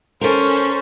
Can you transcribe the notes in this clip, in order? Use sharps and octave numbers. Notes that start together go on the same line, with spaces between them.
C#4 A4 A#4 C5